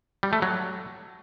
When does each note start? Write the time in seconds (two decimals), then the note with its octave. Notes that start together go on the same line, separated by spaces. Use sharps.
0.23 G3
0.33 A3
0.42 F#3